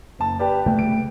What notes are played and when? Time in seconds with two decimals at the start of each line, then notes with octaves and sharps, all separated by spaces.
0.19 F#1 A5
0.39 G4 B4 D5
0.66 C#3 A3 G5
0.79 D7